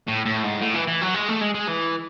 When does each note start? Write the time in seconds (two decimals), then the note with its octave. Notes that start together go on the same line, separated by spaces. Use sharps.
0.08 A2
0.26 A2
0.43 G#2
0.61 A2
0.74 E3
0.88 E3
1.01 F#3
1.14 G#3
1.28 A3
1.41 G#3
1.55 G#3
1.68 E3